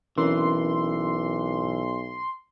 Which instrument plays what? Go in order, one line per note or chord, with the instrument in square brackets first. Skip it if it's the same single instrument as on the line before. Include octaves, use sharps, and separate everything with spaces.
[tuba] B1 [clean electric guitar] E3 [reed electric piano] C4 C#4 A#4 [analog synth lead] C6